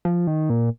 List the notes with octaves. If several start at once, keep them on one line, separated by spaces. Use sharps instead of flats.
F3
D#3
A#2